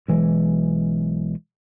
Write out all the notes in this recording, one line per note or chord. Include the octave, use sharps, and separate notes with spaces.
B1 E3 G#3